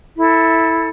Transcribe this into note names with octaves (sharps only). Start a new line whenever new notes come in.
E4 A4